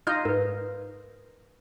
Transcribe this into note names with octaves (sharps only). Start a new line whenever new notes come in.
D#4 F4 D#5 F6 G6
G#2 A#4 B4